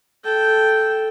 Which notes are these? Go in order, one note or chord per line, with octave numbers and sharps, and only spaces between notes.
A4 G5